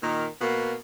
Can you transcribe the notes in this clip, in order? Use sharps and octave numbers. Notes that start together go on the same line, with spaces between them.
A#2 D#3
B2 A#3 B3